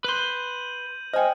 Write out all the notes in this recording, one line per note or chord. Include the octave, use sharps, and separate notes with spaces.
B4 C6 G6 D#7 F#7
C5 D#5 G5 G#5 F6